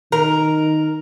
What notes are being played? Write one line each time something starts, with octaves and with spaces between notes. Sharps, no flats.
D#3 A#4